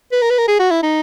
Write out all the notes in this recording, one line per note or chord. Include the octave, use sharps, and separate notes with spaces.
B4
A#4
B4
A#4
G#4
F#4
E4
D#4